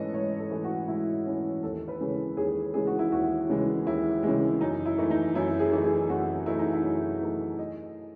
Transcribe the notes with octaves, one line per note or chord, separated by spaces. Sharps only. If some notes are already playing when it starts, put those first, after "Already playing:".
Already playing: G#2 E3 A3 C#4 A4 B4 D#5
G#2 C#5
A4
E3 A3 C#4
F#4
G#2 E4
E3 A3 C#4
D#2 A4
B4
C#3 E3 G#3
D#2 G#4
C#3 E3 G#3 G#4
F#4
E4
D#2 F#4
C#3 E3 G#3
D#2 E4
C#3 E3 G#3
F#2 D#4
E4
E3 A3 D#4
D#4
F#2 E4
G#4
E3 A3 D#4
G#4
F#2 F#4
E3 A3 D#4 E4
D#4
E4
F#2
E3 A3 D#4
D#5